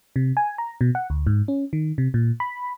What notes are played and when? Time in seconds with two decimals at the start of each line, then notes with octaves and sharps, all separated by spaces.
0.16 C3
0.37 G#5
0.58 A#5
0.81 B2
0.95 F#5
1.10 D2
1.27 G#2
1.48 C#4
1.73 D#3
1.98 C3
2.14 A#2
2.40 B5